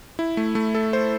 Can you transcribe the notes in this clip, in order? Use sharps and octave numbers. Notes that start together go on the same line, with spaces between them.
E4
A3
A3
A4
C5